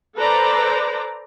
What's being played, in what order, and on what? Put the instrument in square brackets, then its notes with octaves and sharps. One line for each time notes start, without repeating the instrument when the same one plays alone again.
[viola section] A4 B4 C5 D5 A#5